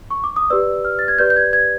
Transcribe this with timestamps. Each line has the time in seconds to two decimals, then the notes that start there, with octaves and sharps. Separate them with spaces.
0.10 C#6
0.24 D6
0.36 D#6
0.50 G4 B4 D5 E6
0.85 F6
0.99 A6
1.08 G#6
1.18 G4 B4 D5 G6
1.30 G6
1.36 G#6
1.53 G#6